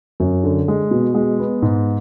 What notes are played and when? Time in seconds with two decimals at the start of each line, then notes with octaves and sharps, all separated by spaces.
0.20 F#2
0.44 D3
0.68 G#3
0.91 B2
1.14 G#3
1.39 B3
1.62 G#2